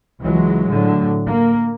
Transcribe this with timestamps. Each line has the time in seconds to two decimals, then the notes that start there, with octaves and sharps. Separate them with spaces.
0.23 C#2 E3 F#3 G#3
0.68 A2 D3 F#3
1.28 A#3